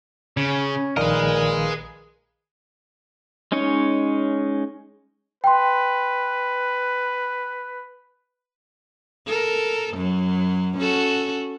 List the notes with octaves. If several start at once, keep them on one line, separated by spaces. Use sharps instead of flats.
C#3 C#4
A#1 A#2 D#3 G#4 A#4 B4 D#5 F5
G#3 C#4 D#4 C#5
B4 G5 C6
A4 A#4
F#2 F#3
C#4 F#4 A4